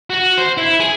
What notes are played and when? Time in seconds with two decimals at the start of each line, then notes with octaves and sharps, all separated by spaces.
0.10 F#4
0.38 C5
0.57 E4
0.80 G#4